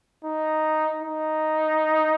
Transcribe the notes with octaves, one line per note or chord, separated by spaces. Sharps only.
D#4
D#4